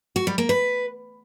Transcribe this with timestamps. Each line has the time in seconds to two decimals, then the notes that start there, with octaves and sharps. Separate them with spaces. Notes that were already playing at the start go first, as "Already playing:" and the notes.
0.16 F#4
0.27 G3
0.38 A#3
0.49 B4